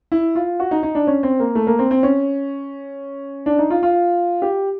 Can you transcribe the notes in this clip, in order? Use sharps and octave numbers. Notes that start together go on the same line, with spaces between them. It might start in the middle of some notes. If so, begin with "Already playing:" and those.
E4
F4
F#4
D#4
D#4
D4
C#4
C4
A#3
A3
A#3
C4
C4
C#4
D4
D#4
F4
F4
G4